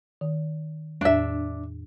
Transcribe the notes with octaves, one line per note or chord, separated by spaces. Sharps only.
D#3
E2 A2 D4 E5